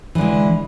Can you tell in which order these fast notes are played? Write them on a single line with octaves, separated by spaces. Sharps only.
E3 D3 G#3